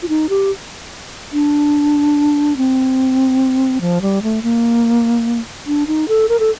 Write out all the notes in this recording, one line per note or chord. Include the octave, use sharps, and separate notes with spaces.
F4
D#4
G4
D4
C4
F3
G3
A3
A#3
D4
D#4
A4
A#4
A4